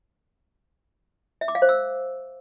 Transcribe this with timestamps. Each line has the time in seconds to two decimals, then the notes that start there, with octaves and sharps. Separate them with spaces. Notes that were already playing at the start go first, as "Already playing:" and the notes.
1.41 E5
1.48 D6
1.55 F5
1.62 C5
1.69 E6